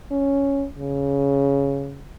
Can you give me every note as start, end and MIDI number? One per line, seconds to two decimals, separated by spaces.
0.11 0.66 61
0.78 2.04 49